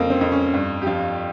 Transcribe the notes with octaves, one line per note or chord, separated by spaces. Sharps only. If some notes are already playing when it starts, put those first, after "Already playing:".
Already playing: F2 C#3 A#3 C4
C4
F2
C#4
G2
G4
F3 F4